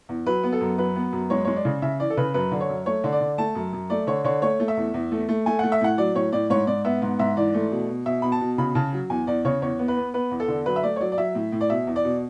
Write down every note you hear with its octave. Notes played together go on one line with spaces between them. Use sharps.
E2
F#3 B4
B3
A4
F#2
F#3 B4
B3
F#2
G#3 C#5
G#3 C#5
D5
C#3
C#3 E5
E3 D5
A4
C#3 B4
F#2 B4
D3
C#5
F#2
A3 C#5
D3
D5
D3
A3 A5
F#2
F#2
A3 D5
D3 C#5
D3 C#5
A3 C#5
A3
E5
E2
E2
A3
A3
A3 G#5
A3 F#5
E5
A2 F#5
F#3 D5
A2 C#5
A2 D5
G#2 C#5
G#2 D5
B3 E5
G#2
G#2 E5
E3 D5
A3
B2
B2
B2 E5
B2 B5
A5
B2
C#3 B5
C#3 A5
F#3
E2 G#5
E2 D5
C#3 C#5
E2 C#5
B3
B4
B3
B3 B4
E2
A4
D3
F#3 B4
E5
A3 D5
C#5
F#3 D5
D5
F#3 E5
A2
A2
D5
B2 E5
E2
D5
B2